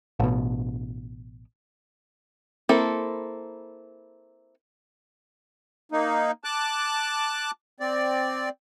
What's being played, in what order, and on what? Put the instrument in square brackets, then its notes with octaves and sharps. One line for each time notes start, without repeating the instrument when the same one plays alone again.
[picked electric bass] A1 B2
[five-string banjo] A#3 C4 E4 A4
[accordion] A#3 D#4
A5 D6 F#6
C4 D5